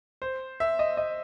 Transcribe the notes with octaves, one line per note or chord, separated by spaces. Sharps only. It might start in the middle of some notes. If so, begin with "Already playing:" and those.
C5
E5
D#5
D#5